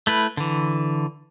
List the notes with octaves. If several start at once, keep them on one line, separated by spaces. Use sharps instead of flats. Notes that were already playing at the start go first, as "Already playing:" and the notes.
A3 E4 B4
D3 E3